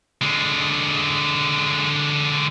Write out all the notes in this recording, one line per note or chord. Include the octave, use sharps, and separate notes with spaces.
D3 G#3